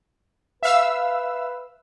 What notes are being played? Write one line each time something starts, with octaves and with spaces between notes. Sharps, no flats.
B4 E5 F5 E6